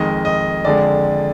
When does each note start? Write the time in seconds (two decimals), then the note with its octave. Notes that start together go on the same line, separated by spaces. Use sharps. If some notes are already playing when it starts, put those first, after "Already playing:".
Already playing: F2 D#3 G#3 D#5
0.25 D#5
0.65 F2 D3 G#3 D5